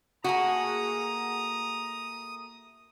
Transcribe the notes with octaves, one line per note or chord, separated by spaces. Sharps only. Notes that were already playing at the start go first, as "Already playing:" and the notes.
A3 A#3 F#4 G#4 A#5 D#6